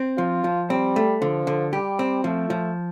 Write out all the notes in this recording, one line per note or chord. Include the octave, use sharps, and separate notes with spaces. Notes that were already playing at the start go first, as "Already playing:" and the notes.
Already playing: C4
F3 F4
F3
G3 C4
A3
D3 F3
D3
G3 G4
C4
F3 A3
F3